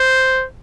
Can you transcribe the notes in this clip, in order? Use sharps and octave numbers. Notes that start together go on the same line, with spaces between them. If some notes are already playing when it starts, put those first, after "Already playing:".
Already playing: C5